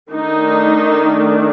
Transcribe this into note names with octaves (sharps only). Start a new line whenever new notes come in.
D#3 A3 D4 D#4